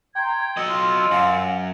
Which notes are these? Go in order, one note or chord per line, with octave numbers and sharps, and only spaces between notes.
G5 A#5 C6 G#6
F#3 D#5 E6
F4
F#2 F5